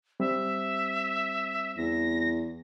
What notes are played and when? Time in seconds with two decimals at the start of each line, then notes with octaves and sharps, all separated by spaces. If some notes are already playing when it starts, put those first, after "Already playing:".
0.20 G3 C4 E5
1.77 E2 A#6